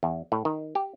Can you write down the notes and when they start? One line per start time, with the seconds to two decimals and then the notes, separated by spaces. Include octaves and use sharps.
0.03 E2
0.32 A2
0.45 D#3
0.75 G4